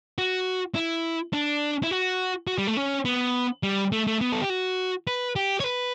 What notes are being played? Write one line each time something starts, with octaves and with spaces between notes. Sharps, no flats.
F#4
E4
D4
E4
F#4
F#4
G3
A3
C#4
B3
G3
A3
A3
B3
A4
G4
F#4
B4
G4
C#5
B4